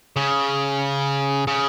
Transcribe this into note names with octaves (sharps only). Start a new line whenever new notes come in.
C#3
C#3